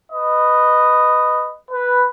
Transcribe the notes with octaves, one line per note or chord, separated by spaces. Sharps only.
B4 D#5
B4